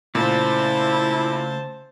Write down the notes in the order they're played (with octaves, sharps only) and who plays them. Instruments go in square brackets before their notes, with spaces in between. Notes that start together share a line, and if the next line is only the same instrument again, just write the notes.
[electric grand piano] A#2 [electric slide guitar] C#3 A3 [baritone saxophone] E4 [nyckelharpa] C5 A5